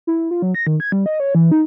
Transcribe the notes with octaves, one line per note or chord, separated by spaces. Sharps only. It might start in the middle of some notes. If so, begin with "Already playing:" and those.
E4
F4
F#3
A#6
D#3
G#6
G3
D#5
C#5
E3
D#4